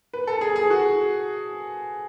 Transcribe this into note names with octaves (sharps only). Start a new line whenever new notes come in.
B4
A4
G#4
G#4
F#4